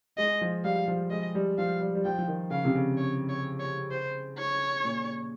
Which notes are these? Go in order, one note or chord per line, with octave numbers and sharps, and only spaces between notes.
G#3 D#5
F3
G3 F5
F3
G#3 D#5
G3
F3 F5
G3
G3
F3 G5
F3
D#3
C#3 F5
C3
C#3
C#5
C#5
C#5
C5
C#5
A#2